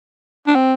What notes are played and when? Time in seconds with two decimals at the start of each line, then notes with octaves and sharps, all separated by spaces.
0.47 D4
0.55 C4